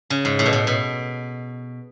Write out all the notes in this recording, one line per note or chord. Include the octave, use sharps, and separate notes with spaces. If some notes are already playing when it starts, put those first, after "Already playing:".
C#3
G#2
A2
B2
A2
B2